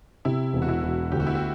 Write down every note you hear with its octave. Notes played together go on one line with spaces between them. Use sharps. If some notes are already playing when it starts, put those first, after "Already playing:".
C3 E4
E1
F#4
E4
E1
D2 G4
F#4
E4
F#4